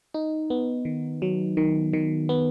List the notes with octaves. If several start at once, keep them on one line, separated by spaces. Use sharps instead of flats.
D#4
B3
D#3
F#3
D#3
D#3
B3